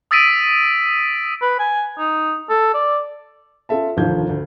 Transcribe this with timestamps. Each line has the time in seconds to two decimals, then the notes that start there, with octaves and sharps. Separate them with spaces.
0.11 D#6 E6 A6 B6 D7 D#7
1.42 B4
1.59 G#5
1.98 D#4
2.50 A4
2.74 D5
3.69 C#4 F4 A4 E5 A5
3.97 F1 D#2 D3 F3 G6 G#6
4.29 D2